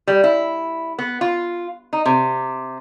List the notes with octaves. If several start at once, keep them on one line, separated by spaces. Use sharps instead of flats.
G3
E4
B3
F4
D#4
C3